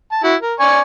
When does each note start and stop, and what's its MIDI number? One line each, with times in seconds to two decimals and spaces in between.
0.12 0.20 81
0.24 0.35 64
0.24 0.35 66
0.41 0.54 70
0.60 0.81 74
0.60 0.81 80
0.60 0.81 85